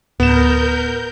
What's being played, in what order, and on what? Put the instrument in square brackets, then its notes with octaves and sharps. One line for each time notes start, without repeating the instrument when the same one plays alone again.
[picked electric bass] D1 [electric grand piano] B3 E7 [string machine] A#4 G6